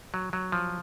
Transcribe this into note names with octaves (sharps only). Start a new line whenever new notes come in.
F#3
F#3
F3